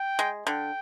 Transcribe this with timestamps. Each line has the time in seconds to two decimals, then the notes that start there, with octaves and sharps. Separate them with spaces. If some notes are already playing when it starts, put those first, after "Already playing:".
Already playing: G5
0.19 G#3
0.46 D3 G5